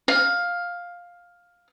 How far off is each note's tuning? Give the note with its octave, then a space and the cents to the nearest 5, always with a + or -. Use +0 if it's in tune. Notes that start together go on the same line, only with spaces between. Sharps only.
F5 +10